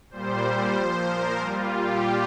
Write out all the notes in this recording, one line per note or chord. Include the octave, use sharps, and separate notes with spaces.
A#2 G3 C5
A#2 F3
A#4
A#2 G3 F4
G4